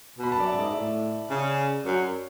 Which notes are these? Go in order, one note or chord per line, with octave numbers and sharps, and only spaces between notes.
B2
B5
A5
F#2 D5
E5
G#2 D5
A2 E5
C#3 D5
F#2 C#5